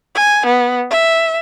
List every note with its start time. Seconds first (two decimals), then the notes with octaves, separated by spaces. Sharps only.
0.15 G#5
0.46 B3
0.90 E5